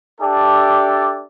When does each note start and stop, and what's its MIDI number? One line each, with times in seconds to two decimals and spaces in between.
0.21 1.23 62
0.21 1.23 67
0.21 1.23 69
0.21 1.23 74
0.21 1.23 76